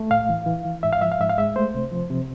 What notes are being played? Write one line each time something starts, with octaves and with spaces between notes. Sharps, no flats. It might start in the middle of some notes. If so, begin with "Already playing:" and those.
Already playing: A3
A2 F5
E3
E3
E3
G#2 E5
F5
F3 E5
F5
G#2 E5
F5
G#3 E5
A3 C5
C3
F3
C3